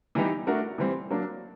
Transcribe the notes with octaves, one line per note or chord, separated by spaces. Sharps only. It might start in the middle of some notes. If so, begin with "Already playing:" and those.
E3 G3 B3 D#4 G4
A3 D4 F#4 A#4
E3 G3 C4
F#3 A#3 D4